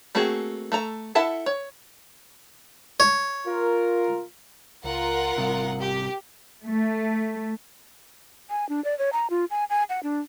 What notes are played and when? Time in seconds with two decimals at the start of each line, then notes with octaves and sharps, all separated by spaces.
0.15 A3 A#3 C4 F#4 G#4
0.72 A3 A4 A#5
1.15 E4 A4 E5 F#5 A5
1.46 C#5
3.00 C#5
3.46 F4 A#4
4.84 C#2 F4 A#4 F#5
5.36 G#1 C3 G3
5.80 G4
6.65 A3
8.50 G#5
8.69 D4
8.84 D5
8.99 C#5
9.13 A#5
9.30 F4
9.50 G#5
9.70 G#5
9.89 F#5
10.03 D4